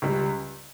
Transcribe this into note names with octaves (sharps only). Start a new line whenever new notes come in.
C#2 C#3 G3